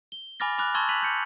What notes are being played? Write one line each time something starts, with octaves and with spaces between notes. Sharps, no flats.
G7
G#5 B5 D6 F6 A6 A#6
B5 D6 F6 F#6
A5 C6 C#6 E6 G#6 A6
F#6 B6 D#7 F7 F#7
G6 C#7